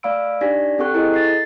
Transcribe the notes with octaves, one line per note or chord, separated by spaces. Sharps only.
A3 D5 F5 B5 E6 D7
D4 D#4 G4 D5 A#6 B6
C4 G4 A4 G5 C#6 F#6
E4 G#4 A4 C5 D#5
A6 C7